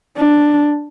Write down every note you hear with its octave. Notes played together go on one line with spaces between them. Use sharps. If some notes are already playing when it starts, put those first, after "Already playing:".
D4